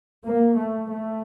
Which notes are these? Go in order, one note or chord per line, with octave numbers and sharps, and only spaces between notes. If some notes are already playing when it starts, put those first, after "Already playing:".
A#3
A3
A3